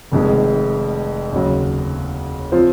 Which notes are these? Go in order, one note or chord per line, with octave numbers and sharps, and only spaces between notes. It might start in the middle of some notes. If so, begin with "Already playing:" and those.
F1 F2 D#3 G#3
D#2 C#3 F#3
F3 C4 F4 C5